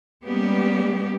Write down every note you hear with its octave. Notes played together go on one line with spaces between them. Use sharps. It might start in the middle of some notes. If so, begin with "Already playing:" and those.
G3 G#3 A#3 B3 C#4 G4